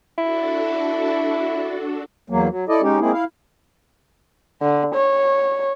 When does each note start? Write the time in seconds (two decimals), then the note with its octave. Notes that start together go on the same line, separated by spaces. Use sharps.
0.18 D4 E4 F#4 A4
2.30 E2 F#3 A#3
2.49 F#3
2.69 E4 A4 D5 D#5
2.82 G#3 C#4 D#4 G4
3.00 G#3 A#3 C4 E4 G#4
3.12 E4 F5
4.62 D3
4.95 C#5